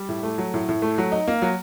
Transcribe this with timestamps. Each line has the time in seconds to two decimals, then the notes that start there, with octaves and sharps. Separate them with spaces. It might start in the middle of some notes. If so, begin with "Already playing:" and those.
Already playing: G3
0.09 A2
0.23 A3
0.38 F#3
0.54 A2
0.69 A2
0.82 A3
0.98 F#3
1.12 D#4
1.28 A#3
1.42 F#3